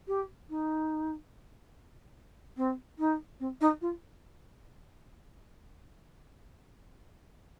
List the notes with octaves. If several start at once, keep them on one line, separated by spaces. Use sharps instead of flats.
G4
D#4
C4
D#4
C4
D#4
F4